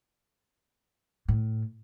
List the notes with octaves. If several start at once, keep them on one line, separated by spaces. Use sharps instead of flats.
A2